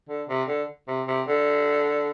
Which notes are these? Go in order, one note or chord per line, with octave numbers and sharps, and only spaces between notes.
D3
C3
D3
C3
C3
D3